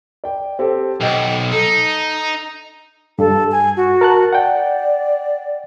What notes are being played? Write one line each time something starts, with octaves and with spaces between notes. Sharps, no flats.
D5 G5
C4 G4 A4
B1 D#5 G5
D#4 A4
G2 A4
G#5
F#4
A#4 A5 F#6
D5 F#5 G5